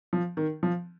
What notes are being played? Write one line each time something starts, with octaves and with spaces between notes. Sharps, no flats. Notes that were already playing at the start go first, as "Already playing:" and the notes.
F3
D#3
F3